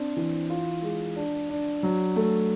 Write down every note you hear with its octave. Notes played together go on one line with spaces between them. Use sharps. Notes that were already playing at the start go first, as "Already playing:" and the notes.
Already playing: C4 D4
E3
F4
G#3
D4
D4
F#3
A3